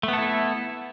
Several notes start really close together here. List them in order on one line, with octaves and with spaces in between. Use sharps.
A3 B3 A4 E4